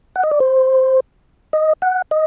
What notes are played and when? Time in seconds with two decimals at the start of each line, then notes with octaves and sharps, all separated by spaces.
0.16 F#5
0.23 D#5
0.31 D5
0.40 C5
1.53 D#5
1.82 F#5
2.11 D#5